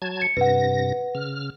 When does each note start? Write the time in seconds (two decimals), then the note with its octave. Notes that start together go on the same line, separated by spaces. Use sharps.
0.02 F#3 A5 G#6
0.22 C#7
0.37 G2 C3 B4 F#5 A#6
1.15 C#3 F6